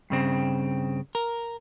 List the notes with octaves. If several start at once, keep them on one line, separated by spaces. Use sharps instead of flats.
G2 C#3 C4
A#4